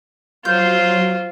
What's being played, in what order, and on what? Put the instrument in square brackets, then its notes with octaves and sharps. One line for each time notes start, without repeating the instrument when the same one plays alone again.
[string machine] F#3 [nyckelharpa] F4 C5 [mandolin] G6